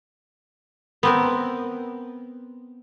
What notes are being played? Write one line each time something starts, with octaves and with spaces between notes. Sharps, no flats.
B3 C4 A#4